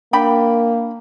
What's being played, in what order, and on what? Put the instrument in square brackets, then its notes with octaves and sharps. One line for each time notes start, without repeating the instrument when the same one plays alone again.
[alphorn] A#3 [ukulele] D4 G5 B5